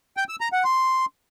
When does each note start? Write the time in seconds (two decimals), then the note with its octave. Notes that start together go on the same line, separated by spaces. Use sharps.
0.17 G5
0.29 E6
0.41 A#5
0.53 F#5
0.64 C6